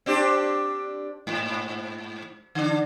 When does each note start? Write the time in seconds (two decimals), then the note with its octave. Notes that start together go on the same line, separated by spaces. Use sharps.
0.06 C4 D4 G4
1.27 G#2
2.55 D3 D4